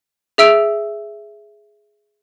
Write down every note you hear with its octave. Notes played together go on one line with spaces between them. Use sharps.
G#4 E5 E6 D7 F7